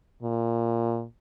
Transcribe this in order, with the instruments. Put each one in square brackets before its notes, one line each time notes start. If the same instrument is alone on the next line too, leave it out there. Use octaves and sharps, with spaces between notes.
[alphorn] A#2